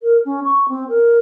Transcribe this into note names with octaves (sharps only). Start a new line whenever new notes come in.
A#4
C#4
C#6
C4
A#4